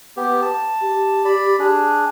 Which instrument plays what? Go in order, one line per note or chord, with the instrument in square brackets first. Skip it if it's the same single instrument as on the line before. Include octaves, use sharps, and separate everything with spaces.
[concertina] B3 G4
A5
[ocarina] G4
[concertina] D5 B5
D4 G#4